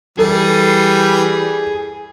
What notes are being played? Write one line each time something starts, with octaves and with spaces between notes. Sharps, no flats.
E3 G3 G#4 A4